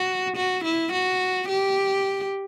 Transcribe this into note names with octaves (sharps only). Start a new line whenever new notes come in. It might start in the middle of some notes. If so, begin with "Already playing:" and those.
Already playing: F#4
F#4
E4
F#4
G4